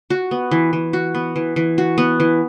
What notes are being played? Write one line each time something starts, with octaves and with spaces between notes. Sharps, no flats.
F#4
B3
E3
E3
F#4
B3
E3
E3
F#4
B3
E3